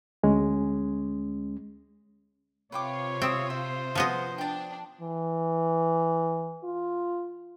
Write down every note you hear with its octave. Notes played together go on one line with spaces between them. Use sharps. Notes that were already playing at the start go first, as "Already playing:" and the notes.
D2 G#3 C#4
C3 F4 B4 C#5 G5 D6
C4 E5 D#6
C5 E5
F3 B3 D#5
D4 G5 A5
E3
F4